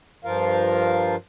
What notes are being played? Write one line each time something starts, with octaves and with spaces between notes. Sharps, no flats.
G2 F3 F4 A#4 F5